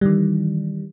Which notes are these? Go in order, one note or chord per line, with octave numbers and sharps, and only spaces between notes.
D#3 E3 G3